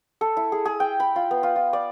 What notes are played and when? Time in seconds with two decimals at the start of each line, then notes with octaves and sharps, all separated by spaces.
0.21 A4
0.37 E4
0.52 G#4
0.65 G#4
0.80 G5
1.00 B5
1.16 F4
1.31 B3
1.43 F4
1.56 F4
1.73 D5